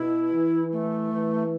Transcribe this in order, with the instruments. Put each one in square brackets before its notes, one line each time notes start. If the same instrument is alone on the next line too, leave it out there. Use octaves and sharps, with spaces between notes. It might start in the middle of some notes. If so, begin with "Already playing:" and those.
Already playing: [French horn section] B2 [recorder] E4
[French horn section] E3
[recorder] A3
[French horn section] E3